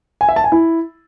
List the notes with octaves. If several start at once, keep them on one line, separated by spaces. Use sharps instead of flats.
G#5
E5
A5
G#5
E4